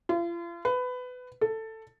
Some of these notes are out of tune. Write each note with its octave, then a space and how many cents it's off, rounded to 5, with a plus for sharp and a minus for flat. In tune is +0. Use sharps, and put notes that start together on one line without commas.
F4 -40
B4 +20
A4 +10